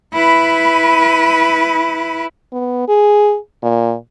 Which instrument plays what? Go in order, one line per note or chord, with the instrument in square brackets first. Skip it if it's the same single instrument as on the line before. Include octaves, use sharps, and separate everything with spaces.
[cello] E4 B4
[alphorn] B3
G#4
A#2